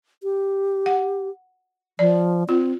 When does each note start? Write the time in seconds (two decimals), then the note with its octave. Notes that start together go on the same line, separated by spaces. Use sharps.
0.23 G4
0.86 F#5
1.99 F3 D5
2.49 C4 F4